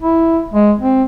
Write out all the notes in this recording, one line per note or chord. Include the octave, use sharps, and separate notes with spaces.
E4
G#3
C4